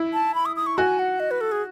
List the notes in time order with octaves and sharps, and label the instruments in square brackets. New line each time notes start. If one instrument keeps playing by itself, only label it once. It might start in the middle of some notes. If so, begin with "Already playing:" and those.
Already playing: [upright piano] E4
[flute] A5
B5
D#6
D#6
C#6
[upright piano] F#4 [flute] G#5
[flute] F#5
D#5
B4
A4
G#4